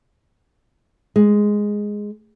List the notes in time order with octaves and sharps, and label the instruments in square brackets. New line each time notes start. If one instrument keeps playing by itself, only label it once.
[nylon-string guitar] G#3